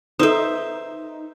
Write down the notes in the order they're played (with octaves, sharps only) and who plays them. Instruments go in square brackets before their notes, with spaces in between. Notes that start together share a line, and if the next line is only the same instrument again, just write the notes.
[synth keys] D#4 [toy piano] A4 B4 D#6 [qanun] C5 E5